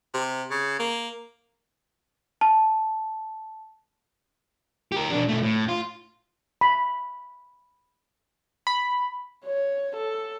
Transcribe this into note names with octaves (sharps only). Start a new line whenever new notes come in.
C3
C#3
A#3
A5
G4 A#4
B2 D4
B2 A3
A2
F4
B5
B5
C#5
A4